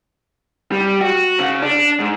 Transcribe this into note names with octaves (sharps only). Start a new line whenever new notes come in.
G3
F#4
C#3
D4
G#2